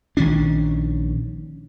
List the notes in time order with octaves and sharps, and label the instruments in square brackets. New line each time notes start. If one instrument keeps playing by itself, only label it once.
[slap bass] A#1 D#3 C#4 D4